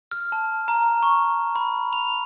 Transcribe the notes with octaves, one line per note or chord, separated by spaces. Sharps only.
F6
A5
A#5
C#6
B5
F7